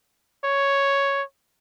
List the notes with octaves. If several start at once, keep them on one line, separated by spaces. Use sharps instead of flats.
C#5